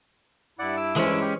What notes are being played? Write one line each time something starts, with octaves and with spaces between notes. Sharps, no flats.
G2 E4 D5 F#5
D6 E6
E3 G#3 C#4 C5
G4